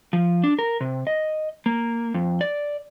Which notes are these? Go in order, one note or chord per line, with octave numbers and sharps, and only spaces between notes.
F3
D4
A#4
C3
D#5
A#3
F2
D5